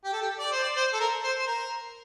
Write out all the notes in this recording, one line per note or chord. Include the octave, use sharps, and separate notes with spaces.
G4
A4
G4
D5
C5
D5
C5
A4
A#4
C5
C5
A#4